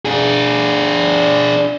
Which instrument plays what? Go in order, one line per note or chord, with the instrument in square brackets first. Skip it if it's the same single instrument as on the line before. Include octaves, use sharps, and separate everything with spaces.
[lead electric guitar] D4 G#4